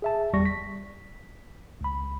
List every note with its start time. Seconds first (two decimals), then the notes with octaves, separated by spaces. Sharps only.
0.02 G#4 E5 A5
0.33 G1 E2 G3 C#6 A#6
0.46 B6
1.81 C#2 B5